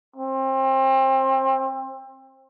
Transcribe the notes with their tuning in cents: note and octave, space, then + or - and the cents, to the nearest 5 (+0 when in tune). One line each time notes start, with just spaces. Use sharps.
C4 +30